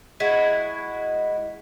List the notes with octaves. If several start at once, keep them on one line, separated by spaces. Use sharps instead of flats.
G#3 E4 F#4